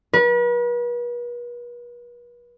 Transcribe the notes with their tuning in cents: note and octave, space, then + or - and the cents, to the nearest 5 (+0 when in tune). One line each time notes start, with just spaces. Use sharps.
B4 -40